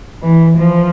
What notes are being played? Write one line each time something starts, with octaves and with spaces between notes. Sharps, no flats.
E3
F3